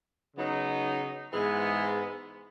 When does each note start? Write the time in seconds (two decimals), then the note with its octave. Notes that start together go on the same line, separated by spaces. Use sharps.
0.35 C#3 F#3 B3 D#4
1.30 G#2 E3 G#3 B3